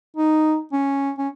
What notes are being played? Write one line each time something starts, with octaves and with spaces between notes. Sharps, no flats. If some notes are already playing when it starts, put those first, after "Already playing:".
D#4
C#4
C#4